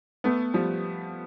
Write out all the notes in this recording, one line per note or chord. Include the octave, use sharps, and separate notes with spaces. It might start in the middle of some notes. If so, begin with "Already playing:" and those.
A3 B3
F3 G3